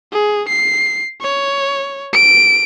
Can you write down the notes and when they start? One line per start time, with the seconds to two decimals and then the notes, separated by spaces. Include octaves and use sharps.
0.13 G#4
0.48 C7
1.21 C#5
2.13 D7